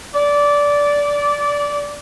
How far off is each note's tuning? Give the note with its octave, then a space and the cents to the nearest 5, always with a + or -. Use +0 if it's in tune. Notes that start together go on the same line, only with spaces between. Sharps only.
D5 -15